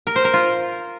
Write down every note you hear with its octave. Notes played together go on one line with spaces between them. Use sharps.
A#4
C5
A#4
F4